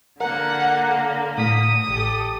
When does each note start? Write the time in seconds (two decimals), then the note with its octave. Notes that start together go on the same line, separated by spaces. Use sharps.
0.20 D3 A#3 A#4 F#5
1.38 A2 D#6 B6
1.89 A1 G4 A4